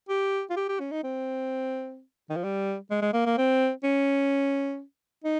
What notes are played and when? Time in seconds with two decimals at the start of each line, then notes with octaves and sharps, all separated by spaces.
0.09 G4
0.50 F4
0.56 G4
0.69 G4
0.80 C#4
0.91 D#4
1.04 C4
2.30 D#3
2.36 F3
2.44 G3
2.91 G#3
3.02 G#3
3.13 A#3
3.26 A#3
3.38 C4
3.84 C#4
5.24 D#4